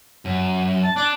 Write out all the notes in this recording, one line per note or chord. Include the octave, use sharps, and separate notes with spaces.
F#2
A5
D4 A5 D6 F#6